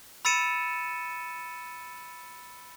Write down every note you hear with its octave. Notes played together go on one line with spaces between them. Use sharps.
B5 E6 A6 C#7 D#7 E7